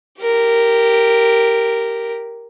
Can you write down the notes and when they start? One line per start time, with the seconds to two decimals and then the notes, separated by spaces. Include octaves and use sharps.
0.22 G4 A#4